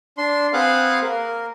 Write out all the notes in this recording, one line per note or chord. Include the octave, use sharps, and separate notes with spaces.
D4 C6
C4 G#4 B4 F5 F#5 F#6
A#3 A#4